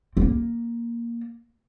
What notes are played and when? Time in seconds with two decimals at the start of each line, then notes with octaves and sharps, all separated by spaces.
0.17 C4
0.21 A#3